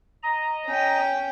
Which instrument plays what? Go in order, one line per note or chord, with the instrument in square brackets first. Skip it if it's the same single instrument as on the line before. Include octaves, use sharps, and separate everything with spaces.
[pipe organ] D#5 A#5
[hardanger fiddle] C#4 G5